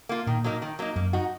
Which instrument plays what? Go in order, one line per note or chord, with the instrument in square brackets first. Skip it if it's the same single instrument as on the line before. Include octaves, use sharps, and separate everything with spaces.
[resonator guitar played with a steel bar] A#3 F4
[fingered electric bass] A#2 [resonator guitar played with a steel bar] D#3
[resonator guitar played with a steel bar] F#3 A#3 D#4
D#3
F#3 A#3 D#4
[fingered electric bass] F#2 [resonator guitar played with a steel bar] A#3
[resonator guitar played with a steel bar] D#4 F#4